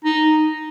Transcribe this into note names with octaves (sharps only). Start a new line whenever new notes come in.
D#4